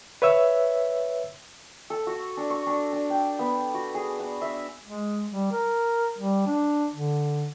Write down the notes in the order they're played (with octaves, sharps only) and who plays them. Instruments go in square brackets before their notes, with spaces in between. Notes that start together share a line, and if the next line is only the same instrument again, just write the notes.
[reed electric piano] B4 C#5 E5 E6
[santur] A4
F#4
D4
C#6
D4
D4
G5
B3
F#4
G#4
F#5
E5
[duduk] G#3
G3
A#4
G3
D4
D3